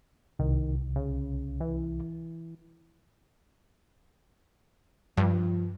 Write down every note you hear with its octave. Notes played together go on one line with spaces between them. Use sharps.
C2 D#3
C#3
E3
G2 F3